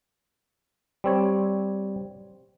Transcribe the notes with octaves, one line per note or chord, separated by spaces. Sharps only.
G3 C4 C#5